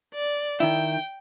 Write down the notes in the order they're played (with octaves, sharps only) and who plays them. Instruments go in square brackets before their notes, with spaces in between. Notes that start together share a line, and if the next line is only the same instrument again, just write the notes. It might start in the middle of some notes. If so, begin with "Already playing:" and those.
[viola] D5
[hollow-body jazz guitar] D#3 E4 [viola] G5